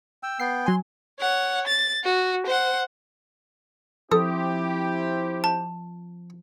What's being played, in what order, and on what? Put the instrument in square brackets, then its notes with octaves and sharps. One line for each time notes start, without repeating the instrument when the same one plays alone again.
[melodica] G5 E6
[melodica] B3 G5 [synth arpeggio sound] C7
[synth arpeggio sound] F#3 G#5 [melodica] C6
[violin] C#5 F#5
A6
F#4
C5 F#5
[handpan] F3 [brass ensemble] C4 E4 G4 [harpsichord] A4 [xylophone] D#6
[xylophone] A5